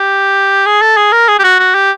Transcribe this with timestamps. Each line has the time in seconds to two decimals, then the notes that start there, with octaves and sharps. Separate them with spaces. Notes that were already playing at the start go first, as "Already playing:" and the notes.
Already playing: G4
0.66 G#4
0.82 A4
0.97 G#4
1.12 A#4
1.28 G#4
1.39 G4
1.44 F#4
1.60 F#4
1.75 G4